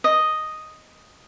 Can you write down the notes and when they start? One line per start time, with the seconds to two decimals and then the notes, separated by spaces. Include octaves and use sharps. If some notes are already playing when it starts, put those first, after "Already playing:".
0.04 D#5